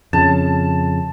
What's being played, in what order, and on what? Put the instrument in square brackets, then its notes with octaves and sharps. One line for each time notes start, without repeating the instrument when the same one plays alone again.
[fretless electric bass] F2 C#3 [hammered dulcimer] A5